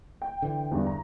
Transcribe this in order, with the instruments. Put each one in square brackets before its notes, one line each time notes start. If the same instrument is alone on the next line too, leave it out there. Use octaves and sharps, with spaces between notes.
[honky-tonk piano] G5
[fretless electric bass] D3 E3
[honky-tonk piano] E2 G2 D4
A#5